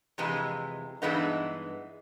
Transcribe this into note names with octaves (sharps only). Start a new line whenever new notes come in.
F2 C3 E3 G#3
G2 E3 G#3 B3 D#4